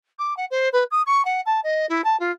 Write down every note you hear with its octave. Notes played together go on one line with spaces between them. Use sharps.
D6
F#5
C5
B4
D#6
C#6
F#5
A5
D#5
E4
A5
F4